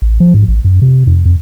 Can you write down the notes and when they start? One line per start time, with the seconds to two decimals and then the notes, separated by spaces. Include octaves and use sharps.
0.02 A1
0.20 F3
0.34 G#2
0.48 A1
0.65 F#2
0.82 C3
1.07 F2
1.25 F2